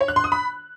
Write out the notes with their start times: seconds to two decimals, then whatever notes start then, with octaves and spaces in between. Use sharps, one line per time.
0.01 C#5
0.08 F#6
0.16 C6
0.24 D#6
0.32 B5